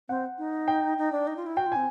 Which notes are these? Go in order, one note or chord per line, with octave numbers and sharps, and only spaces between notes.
C4 F#5
D#4
G5
D#4
D4
D#4
F4
E4
F#4 G5
F4
C4 G#5